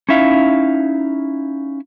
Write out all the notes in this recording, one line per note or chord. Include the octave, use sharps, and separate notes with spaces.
C#4 D#4 E4 E5 F5